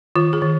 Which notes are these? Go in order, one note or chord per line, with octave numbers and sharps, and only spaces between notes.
D#3 F4
G#4
D#3